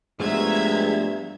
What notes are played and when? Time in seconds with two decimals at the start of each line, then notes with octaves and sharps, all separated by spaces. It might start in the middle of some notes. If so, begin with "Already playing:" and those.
0.20 G2 F3 G#3 A3 B3 E5 A#5 G#6